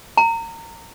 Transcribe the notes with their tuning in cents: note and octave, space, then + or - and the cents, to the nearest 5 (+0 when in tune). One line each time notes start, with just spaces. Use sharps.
A#5 -30